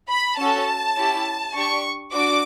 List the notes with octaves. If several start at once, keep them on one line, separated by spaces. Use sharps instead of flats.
B5
C#4 F#4 A4 A5
C#4 E4 G4
D4 G4 C#6
D4 F#4 D6